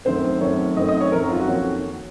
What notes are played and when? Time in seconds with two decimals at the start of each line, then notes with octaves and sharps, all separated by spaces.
0.05 F#2 D#3 A3 C4 C5
0.41 F#2 D#3 A3 C4 C#5
0.77 F#2 D#3 A3 C4 D#5
0.88 D#5
1.01 C#5
1.12 F#2 D#3 A3 C4 A#4
1.30 F4
1.40 F#4
1.48 F2 D#3 A#3 C#4